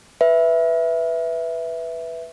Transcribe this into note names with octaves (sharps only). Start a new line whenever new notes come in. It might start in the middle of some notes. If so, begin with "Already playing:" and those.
B4 E5